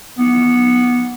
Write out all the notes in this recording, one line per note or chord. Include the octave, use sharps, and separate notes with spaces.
B3